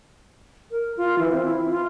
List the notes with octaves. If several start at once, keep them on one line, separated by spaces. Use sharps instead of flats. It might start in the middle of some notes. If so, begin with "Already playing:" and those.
A#4
F4
E3
C4
E4
F4